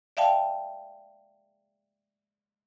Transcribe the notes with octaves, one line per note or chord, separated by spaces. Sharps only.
D5 E5 F5 G5 A5